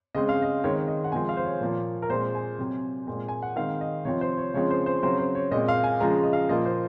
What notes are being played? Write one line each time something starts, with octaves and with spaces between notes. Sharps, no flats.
C#3 G#3 C4 D#5
F5
D#5
D#3 G#3 C4 C#5
C#5
D#5
F#5
C3 F3 G#3 C4 G#5
F5
C5
C#5
A#2 F3 A#3
A#4
A#2 G#3 C4 C5
G#5
C3 F#3 C4
A#2 G#3 C4
G#5
F#5
D#3 G#3 C4 F5
D#5
C3 F3 C4 C#5
C5
C#5
C#3 F3 G#3 C4 C#5
C5
C5
C#3 F#3 C4 C5
C5
C#5
A#2 G#3 C4 D#5
F5
G#5
C#3 F3 G#3 A#5
D#5
F5
A#2 F3 A#3 D#5
C5